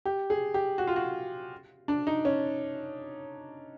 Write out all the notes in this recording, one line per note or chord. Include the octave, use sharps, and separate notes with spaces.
G4
G#4
G4
F#4
F4
F#4
D4
D#4
C#4